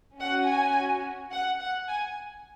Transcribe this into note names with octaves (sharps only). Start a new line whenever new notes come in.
C#4 F#4 F#5
G#5
F#5
F#5
G#5